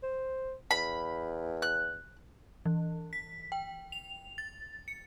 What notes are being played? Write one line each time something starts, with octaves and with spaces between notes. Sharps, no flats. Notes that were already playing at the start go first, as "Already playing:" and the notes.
C5
E2 B5
F#6
E3
B6
G5
F7
A6
C#7